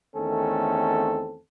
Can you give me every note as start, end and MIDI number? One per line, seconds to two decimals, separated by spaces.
0.15 1.39 40
0.15 1.39 51
0.15 1.39 57
0.15 1.39 60
0.15 1.39 61
0.15 1.39 69